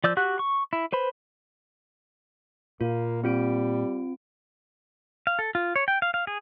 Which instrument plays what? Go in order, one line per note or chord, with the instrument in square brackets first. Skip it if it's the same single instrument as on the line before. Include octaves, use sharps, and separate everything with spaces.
[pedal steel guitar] F3 D5 E6 G6
F#4 G4 F#5 F#6
C#6
E4
B4 C5 B5
[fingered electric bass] A#2 [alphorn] A#3 [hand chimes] F4
[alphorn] G3 [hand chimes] C4 F4 D7
[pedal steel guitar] F5
A4
F4
C#5
G5
F5
F5
G#4